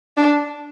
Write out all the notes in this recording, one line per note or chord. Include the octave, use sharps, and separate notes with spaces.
D4